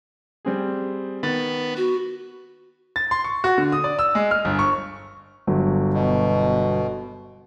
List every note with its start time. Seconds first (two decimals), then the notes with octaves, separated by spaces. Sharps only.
0.45 G3 C4 G#4
1.23 D#3 B3 A6
1.77 F#4
2.96 A6
3.11 C6
3.24 C#6
3.44 F#4
3.58 D3
3.72 D#6
3.84 D5
3.99 E6
4.15 G#3
4.31 F6
4.45 G1
4.59 C#6
5.47 G1 F#3
5.93 B2